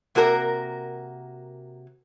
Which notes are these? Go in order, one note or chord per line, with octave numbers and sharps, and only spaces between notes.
C3 A#3 F#4 A#4